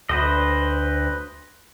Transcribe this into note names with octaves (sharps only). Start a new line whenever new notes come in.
D2 B4 C5 D#5